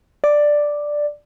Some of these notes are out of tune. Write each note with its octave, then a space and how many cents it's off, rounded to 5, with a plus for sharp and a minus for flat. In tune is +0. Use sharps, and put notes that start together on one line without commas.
D5 +5